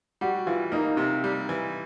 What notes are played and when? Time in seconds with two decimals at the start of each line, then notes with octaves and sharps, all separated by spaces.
0.21 G3 F#4
0.46 E3 F4
0.72 A#3 D#4
0.97 C3
1.24 G3
1.49 E3